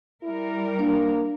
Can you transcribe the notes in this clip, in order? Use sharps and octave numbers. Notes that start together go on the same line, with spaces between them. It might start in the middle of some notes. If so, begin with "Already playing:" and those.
G3 E4 A#4
A#3 D4